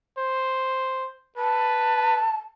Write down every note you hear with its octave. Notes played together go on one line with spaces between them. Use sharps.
C5
B4 A5